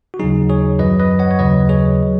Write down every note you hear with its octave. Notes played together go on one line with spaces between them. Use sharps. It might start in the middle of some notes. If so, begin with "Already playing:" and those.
F#4
D#2 C#3 F#3 D#4 G#4
G#4 C#5
F#2 D#3 F#3 B4 D#5
B4 D#5
C#5 F#5
C#5
D#2 C#3 F#3 B4 D#5
G#4 C#5
F#3